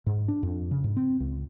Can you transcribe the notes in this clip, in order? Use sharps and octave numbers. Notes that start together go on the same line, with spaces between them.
G#2
D4
F2
C#3
G#2
C4
C#2